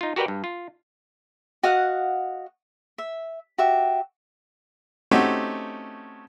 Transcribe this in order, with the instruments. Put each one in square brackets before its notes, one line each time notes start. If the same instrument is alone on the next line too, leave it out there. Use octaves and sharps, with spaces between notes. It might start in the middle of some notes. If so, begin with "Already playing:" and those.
[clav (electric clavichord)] D#4 F4
F#4 G4 A#4 B4 D5 G5
G2
F4
[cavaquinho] F#4 D#5 F5 F#5
E5
F#4 G4 E5
[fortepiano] A3 C4 C#4 D#4 F#4 G4